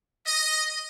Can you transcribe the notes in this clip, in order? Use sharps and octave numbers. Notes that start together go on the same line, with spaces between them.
D#5